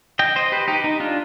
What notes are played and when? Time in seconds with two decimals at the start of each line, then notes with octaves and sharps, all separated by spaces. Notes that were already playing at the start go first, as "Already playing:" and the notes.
0.19 D#5 G5
0.36 C5 D#5
0.52 G4 B4
0.68 D#4 G4
0.84 D#4
1.00 D4 F4